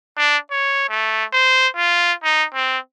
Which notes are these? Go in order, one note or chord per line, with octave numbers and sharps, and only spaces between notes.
D4
C#5
A3
C5
F4
D#4
C4